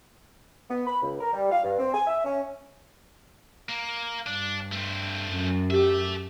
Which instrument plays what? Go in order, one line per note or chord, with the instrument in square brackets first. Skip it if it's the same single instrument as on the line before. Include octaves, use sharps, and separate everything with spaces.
[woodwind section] B3
B5
C#2
A#4
G3
F5
G2
C4
G#5
E5
C#4
[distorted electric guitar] A#3
[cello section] G2 [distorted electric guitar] D4
[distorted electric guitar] A3 C4
[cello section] F#2
[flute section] G4 [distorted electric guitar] A4 E5